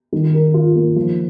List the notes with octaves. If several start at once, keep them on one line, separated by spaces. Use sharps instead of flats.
D#3
A#4
F4
A#3
F3